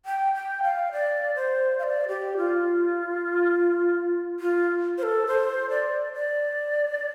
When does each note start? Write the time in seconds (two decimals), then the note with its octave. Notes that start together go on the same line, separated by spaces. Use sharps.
0.06 G5
0.35 G5
0.63 F5
0.92 D5
1.36 C5
1.79 F5
1.83 D5
2.08 G4
2.37 F4
4.40 F4
4.98 C5
5.03 A4
5.27 C5
5.70 D5
6.14 D5